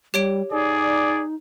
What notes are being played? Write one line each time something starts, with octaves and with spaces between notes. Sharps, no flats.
G3 G4 C#5 D7
D#4 G#4 D5